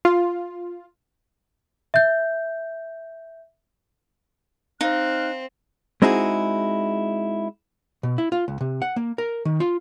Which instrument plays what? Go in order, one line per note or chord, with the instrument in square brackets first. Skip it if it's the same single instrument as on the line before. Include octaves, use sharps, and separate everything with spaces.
[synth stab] F4
[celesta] E5 G6
[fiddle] C4 [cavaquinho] D#4 [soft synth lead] F5 [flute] F#6
[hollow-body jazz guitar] G#3 C4 D#4 E4 F#4 G#4
B2
E4
F4
C#2
C3
F#5
A#3
A#4
D#3
F4